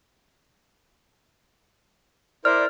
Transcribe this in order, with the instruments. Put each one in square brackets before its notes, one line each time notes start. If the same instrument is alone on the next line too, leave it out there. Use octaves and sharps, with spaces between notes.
[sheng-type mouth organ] E4 A#4 C5 [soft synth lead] D5 [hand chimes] F6